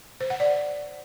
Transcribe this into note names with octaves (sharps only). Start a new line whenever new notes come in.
C5
F#5
D5